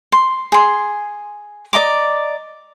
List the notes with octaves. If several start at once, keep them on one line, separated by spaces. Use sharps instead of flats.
C6
G#4 C6
D5 D#5 A#5 D6